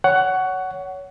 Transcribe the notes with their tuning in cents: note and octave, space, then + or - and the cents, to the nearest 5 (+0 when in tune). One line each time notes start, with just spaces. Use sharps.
C#5 +15 F#5 +10